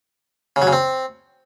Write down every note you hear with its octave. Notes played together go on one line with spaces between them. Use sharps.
C#3
F#3
C#3
C4